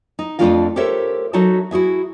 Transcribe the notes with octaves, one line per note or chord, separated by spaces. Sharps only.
D#4
F2 F3 A3 D4 F4 F5
G4 A4 A#4 C5 C#5 E5
F#3 D#4 F#4 A4 E5 A5
E4 F#4 G#4 E5